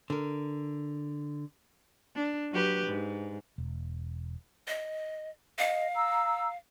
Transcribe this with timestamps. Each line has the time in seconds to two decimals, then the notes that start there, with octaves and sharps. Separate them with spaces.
0.10 D3 A#4
2.15 D4
2.51 F#3 G4 B4
2.86 G#2
3.58 E1
4.68 D#5
5.59 D#5 F5
5.95 A#5 E6